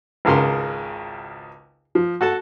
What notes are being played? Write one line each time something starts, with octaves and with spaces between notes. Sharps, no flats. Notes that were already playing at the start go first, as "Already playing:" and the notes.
G#1 C#2 C#3 A#4 C6
F3
F#4 A4 A5